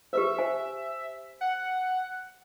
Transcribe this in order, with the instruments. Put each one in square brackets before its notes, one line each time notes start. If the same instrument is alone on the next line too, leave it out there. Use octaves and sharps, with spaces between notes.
[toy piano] G4 B4 C5 [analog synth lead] E5
[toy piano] C5 G#5
[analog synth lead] F#5